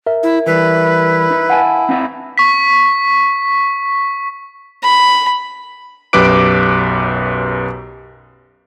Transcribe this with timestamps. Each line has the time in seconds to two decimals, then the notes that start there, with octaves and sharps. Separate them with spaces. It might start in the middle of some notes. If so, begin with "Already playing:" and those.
0.07 A#4 E5
0.23 E4
0.46 E3 G3 E4 B4
1.30 D#4
1.50 F5 F#5 G#5 A5
1.89 C4 D#4 E5
2.38 C#6 B6
4.83 B5
6.13 B1 F#2 G4 B4 D6 D7